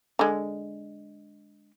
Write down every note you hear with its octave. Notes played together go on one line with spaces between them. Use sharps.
D3 G#3